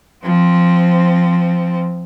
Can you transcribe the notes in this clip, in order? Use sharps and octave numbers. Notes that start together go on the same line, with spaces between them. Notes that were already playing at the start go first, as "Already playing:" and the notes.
F3 C4